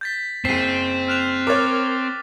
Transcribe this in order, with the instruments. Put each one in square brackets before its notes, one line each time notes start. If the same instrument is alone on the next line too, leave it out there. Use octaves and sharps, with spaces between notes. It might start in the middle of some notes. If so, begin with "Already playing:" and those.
[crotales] G6 A6 B6
[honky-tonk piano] F#1 C7 [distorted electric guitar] C4 [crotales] B6 D#7
[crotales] F6 F#6 F7
[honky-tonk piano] A#4 C#5 [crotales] D6 A6